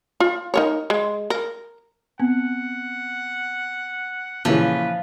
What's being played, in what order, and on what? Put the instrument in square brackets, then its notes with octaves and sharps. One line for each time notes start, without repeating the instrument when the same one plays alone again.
[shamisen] F4
D#4 A#4 C#5
G#3
A#4
[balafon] B3 C4 [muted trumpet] F#5
[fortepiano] A#2 C#3 E3 [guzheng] F3 [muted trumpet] B4 [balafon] C#5 E5 A5